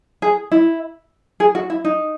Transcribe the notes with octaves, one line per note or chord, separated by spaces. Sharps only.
G#4
E4
G#4
F#4
E4
D#4